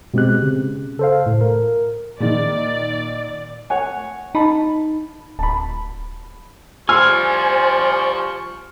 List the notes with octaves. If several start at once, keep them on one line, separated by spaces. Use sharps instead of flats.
B2 G#3 C4 G4 F#6
C#3
A4 C5 F5
A2
A#4
A#2 D#3 D5
C#5 F#5 G#5
D#4 A5 B5
D1 A5 B5
F3 G3 C5 G#5 C6 C#6 F6